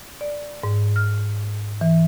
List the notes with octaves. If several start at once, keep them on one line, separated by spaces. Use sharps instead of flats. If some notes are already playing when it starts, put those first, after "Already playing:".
D5
G#2
F6
E3